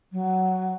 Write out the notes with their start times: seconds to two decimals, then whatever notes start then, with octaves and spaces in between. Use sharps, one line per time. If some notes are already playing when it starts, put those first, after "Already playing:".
0.12 F#3